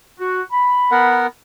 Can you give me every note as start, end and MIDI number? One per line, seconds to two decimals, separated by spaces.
0.20 0.40 66
0.52 1.20 83
0.91 1.27 59
0.91 1.27 70
0.91 1.27 78